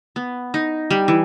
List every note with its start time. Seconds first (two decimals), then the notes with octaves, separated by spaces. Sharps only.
0.16 B3
0.54 D#4
0.91 G3
1.08 E3